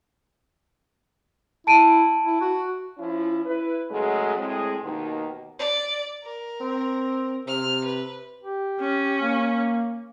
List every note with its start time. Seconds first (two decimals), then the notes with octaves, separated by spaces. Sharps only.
1.67 E4 A5 D7 D#7
2.24 E4
2.41 F#4
2.98 F3 C#4 E4
3.45 E4 B4
3.90 C#3 F#3 G#3 A3
4.36 A2 G#3 C4 G#4
4.83 D#2 B2 D#3
5.59 D5
6.23 A#4
6.61 C4
7.47 C3 F6
7.85 B4
8.43 G4
8.80 C#4
9.21 A#3